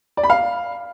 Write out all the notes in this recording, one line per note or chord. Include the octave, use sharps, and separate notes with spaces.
D5
B5
F5